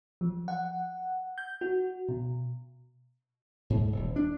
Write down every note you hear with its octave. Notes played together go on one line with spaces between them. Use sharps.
F3
F#5
G6
F#4
B2
G#2
D#1
D4